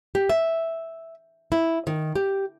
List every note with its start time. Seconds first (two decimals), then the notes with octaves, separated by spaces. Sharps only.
0.15 G4
0.29 E5
1.52 E4
1.87 D#3
2.15 G4